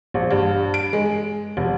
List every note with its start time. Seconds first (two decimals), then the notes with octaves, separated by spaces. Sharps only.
0.14 A#1
0.31 G2
0.74 D7
0.93 G#3
1.57 F1